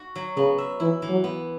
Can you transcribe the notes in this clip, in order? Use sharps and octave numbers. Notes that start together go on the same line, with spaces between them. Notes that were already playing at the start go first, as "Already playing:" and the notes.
Already playing: F#4
F#3
C#3 B3
E5
E3 E4
E3
F#3
B3